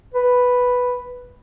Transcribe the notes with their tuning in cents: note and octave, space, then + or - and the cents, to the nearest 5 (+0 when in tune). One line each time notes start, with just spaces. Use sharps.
B4 +0